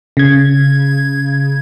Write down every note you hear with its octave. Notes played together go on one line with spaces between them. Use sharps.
C#3 G#6